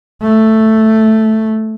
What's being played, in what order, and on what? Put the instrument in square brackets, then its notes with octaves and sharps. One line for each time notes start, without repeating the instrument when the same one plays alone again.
[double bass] A3